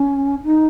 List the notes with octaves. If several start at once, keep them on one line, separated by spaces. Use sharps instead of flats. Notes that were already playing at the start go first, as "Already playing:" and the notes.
Already playing: C#4
D#4